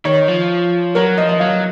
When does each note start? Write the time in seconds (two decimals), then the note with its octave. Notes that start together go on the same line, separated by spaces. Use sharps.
0.05 D#3 C#5
0.28 F3
0.95 F#3 A#4
1.18 F3 D#5
1.29 D#5
1.40 F#3 F5